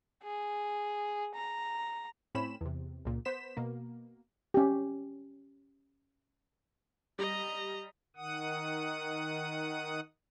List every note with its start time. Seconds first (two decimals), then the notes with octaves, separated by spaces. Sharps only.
0.24 G#4
1.35 A#5
2.35 A2 C4 C#4 B5 E7
2.61 E2 C3
3.05 C#2 A#2
3.25 B3 C5 B6 E7
3.57 B2 A#3
4.54 C#4 G4
7.19 G3 D#5 A#5
8.16 D#3 F#5 D#6